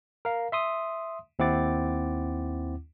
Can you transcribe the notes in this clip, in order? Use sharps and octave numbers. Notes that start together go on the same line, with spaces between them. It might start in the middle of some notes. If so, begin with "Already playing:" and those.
A#4 F5
E5 C6 D#6
D#2 C4 E4 F#5 D6 A6